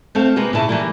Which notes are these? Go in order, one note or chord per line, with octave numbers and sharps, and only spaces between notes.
A3 C4 A4 F5
C3 G#3 A#3 B3 A#4 B4
A#2 C#3 E4 A5
E3 G3 A#3